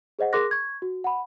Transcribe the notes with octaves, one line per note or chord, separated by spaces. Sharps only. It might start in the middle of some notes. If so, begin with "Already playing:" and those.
G#4 C5 D#5 F#5
G#4 A#4 C6 D6 F#6 A#6
C#6 G#6
F#4
F#5 B5